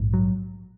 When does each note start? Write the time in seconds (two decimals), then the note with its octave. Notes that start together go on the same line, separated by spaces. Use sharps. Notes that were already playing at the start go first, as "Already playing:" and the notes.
Already playing: A#1 G#2
0.14 F#3